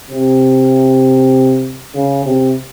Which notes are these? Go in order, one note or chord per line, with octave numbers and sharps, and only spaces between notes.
C3
C#3
C3